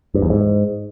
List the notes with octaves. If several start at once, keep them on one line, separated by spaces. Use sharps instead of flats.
G2
E2
G#2